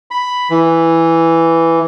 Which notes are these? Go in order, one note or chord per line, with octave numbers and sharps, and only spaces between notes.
B5
E3